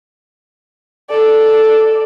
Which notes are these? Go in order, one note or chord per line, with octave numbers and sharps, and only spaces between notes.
A4 D5